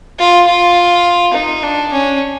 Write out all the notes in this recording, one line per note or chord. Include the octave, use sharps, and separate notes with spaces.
F4
F4
D#4
D4
C#4